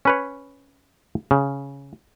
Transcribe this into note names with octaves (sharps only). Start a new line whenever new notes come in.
C#4 B4 C#5
C#3